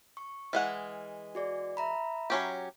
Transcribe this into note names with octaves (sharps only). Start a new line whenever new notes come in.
C#6
E3 G#3 F#5 F6
F#4 G#4 D5
E5 A#5 B5
F#3 C#4 G4